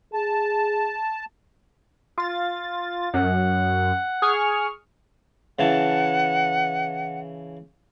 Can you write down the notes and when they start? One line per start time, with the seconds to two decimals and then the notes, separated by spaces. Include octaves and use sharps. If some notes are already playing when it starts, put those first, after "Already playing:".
0.14 G#4 A5
2.18 F4 A6
3.14 F#2 F#5
4.22 G#4 C#6 F6
5.59 C#3 E3 F#5 A5